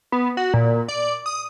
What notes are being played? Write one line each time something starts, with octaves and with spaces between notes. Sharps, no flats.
B3
F#4
A#2
D5
D#6